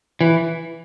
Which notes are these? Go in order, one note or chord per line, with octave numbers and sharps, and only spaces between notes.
E3